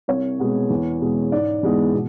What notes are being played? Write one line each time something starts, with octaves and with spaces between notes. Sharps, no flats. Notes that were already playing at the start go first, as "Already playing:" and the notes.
C2 C#5
B2 G#3 B3
E2
B2 G#3
G#2 D5
E3 G#3 B3
B2